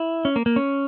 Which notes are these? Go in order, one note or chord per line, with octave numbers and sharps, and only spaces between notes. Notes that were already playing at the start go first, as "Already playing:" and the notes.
Already playing: E4
C#4
A#3
A#3
C#4